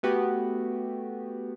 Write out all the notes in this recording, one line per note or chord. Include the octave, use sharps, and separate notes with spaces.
A3 B3 F#4 G4